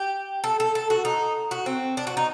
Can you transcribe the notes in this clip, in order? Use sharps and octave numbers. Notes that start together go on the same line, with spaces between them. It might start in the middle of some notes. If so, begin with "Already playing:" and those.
Already playing: G4
A4
A4
A4
F#4
D#4
F#4
C4
D4
F#4
D#4